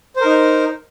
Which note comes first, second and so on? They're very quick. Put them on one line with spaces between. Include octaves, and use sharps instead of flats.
C5 A#4 D#4